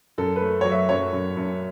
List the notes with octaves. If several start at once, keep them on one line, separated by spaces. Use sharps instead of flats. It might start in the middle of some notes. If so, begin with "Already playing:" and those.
F#2 A4
B4
A3
F#3 C#5
E5
F#2 C#5
F#2
F#2